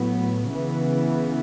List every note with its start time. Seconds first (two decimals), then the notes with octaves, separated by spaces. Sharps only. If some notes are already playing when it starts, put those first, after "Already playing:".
Already playing: A2 F#3 B3
0.51 C#3 E3 B3